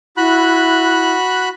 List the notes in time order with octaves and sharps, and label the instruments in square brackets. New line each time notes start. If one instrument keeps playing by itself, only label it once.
[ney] E4 [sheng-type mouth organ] F#4 B5 F#6